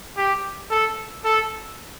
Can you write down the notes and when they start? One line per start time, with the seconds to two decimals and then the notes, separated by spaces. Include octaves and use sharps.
0.17 G4
0.71 A4
1.24 A4